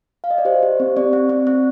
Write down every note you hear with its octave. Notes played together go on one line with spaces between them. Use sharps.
F5
D#5
D5
G4 C5
G4
C4
C4 D5
C4
C4
C4